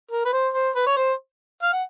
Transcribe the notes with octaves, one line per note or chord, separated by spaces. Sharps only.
A#4
B4
C5
C5
B4
C#5
C5
F5
F#5